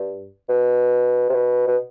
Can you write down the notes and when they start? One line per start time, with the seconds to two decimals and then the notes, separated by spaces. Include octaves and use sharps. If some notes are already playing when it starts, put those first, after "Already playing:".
Already playing: G2
0.49 B2
1.29 C3
1.34 B2
1.67 B2